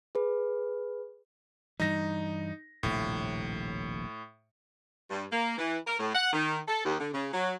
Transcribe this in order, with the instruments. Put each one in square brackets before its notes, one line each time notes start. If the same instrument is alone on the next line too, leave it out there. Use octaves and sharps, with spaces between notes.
[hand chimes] G#4 B4
[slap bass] G2 E3 G3 [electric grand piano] D#4 A#6
[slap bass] D#1 A#1 C3 [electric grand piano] A2
[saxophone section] G2
A#3
E3
A#4
A2
F#5
D#3
A4
D#2
D3
C#3
F#3